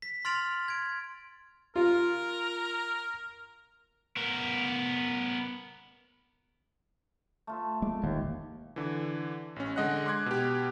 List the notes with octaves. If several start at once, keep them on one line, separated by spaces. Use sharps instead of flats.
B6
C6 F6 A6 D7 F7 F#7
G#6 D7
F4 A#4
B3 A#4
A3 F4 E5
G#3 A3 D5
E1 A#1 D#2 D#3
D3 E3
A1 C#4
D3 G#3 D#5 F#5 F#6
C6 D6 F#6 G#6
B2 G4